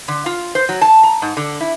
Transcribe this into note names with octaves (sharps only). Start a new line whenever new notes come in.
D3
F4
C5
F#3
A5
A#5
G#2
D3
E4